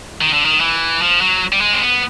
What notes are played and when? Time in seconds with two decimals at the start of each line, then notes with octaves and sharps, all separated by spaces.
0.21 D#3
0.33 D3
0.45 D#3
0.60 E3
1.01 F3
1.21 F#3
1.52 G3
1.61 G#3
1.73 C4
1.81 B3